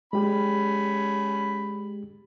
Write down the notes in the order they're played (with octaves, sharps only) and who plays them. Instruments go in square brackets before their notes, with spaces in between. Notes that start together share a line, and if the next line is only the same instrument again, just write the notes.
[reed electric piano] G#3 G4 [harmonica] C#4 B5